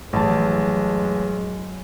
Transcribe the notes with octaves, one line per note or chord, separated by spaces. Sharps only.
A1 F#2 F#3 G#3 A5